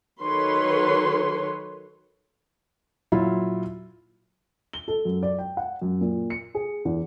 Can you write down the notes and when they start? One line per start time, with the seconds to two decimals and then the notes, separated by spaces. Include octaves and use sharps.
0.21 D#3 F#3 A4 B4 C#5 C6
3.12 A#2 F#3 E4 F4
4.73 G7
4.88 A4
5.05 F#2
5.23 D5
5.39 G5
5.57 F#5
5.82 F#2
6.01 A#2
6.30 C#7
6.55 G#4
6.85 E2